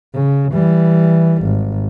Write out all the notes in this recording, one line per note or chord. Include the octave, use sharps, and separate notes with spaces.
C#3
E3 G3
G#1